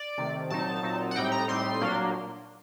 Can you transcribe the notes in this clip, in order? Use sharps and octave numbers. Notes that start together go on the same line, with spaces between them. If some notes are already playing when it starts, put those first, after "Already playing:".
Already playing: D5
C3 D#3 A3
A#2 F#3 C4 D#4 A5
A#2 F#3 C4 D#4
F#5
A2 G3 C4 D#4 G5
A#5
A2 G3 C4 D#4 C6
A#2 F#3 A#3 D4